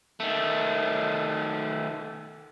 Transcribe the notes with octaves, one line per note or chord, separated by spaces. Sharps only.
D#3 A3